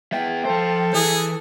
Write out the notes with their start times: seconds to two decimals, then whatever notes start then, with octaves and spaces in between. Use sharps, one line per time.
0.12 B3 E5 G5
0.45 F3 A4 C5
0.94 E3 G#4 D#6